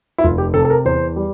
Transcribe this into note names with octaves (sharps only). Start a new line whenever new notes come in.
E4
F1 F4
G4
C3 A4
A4
A#4
E2 C5
G3